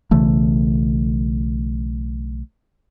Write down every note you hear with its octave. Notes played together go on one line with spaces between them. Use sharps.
B1 C#3 E3 A3